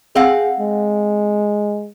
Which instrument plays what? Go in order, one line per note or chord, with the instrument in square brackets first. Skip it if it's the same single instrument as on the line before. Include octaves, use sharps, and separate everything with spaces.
[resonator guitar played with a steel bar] C4 F5 F#5 [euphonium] G#4
[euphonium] G#3